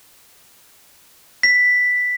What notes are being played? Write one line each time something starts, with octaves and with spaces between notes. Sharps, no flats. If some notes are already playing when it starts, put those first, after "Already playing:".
B6